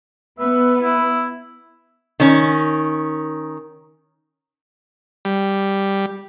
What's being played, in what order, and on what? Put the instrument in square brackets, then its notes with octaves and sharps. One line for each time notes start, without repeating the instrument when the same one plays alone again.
[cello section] B3 [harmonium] B4 [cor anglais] E5
[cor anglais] E4
[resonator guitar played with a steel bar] D#3 C#4
[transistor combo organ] G3